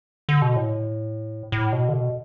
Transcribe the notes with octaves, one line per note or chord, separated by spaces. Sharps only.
D3
B2
A2
A2
B2
D3
B2